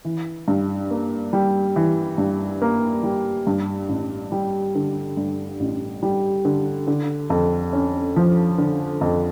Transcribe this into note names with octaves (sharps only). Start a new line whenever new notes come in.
E3
G2
A#3
G3
E3
G2
A#3
G3
G2
A1
G3
D3
G2
A1
G3
D3
D3
F2
C#4
F3
D3
F2